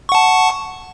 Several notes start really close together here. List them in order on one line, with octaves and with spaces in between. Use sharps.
C#6 F#5 A5